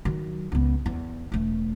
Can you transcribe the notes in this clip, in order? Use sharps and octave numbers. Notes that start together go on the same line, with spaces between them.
D#3 F#3
C#2 B3
E2
E1 A3